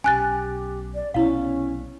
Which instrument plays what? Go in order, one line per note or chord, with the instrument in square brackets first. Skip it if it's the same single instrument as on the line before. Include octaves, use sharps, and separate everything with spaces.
[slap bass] B1 C#4 [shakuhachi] G4 [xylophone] G#5 F#6 A6
[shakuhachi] D5
[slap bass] B1 C3 B3 [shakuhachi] C#4 [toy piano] E4 F5